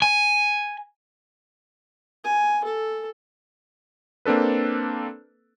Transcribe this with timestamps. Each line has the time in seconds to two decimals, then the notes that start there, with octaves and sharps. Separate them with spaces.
0.02 G#5
2.24 G#5
2.65 A4
4.25 A#3 C4 D4 A4 B4